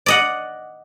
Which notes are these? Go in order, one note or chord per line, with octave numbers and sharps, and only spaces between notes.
D5 D#5 F#5